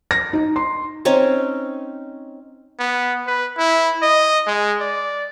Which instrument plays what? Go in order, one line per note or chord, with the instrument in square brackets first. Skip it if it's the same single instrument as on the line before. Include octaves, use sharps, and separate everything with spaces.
[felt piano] A#6
D#4
C6
[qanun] C4 C#4 D#4 C#5
[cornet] B3
B4
E4
D#5
G#3
D5